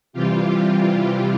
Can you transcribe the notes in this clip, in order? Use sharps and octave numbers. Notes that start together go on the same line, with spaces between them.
C3 E3 G3 F4 G4